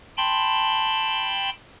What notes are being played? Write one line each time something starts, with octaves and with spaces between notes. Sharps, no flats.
G5 A5 B5 C6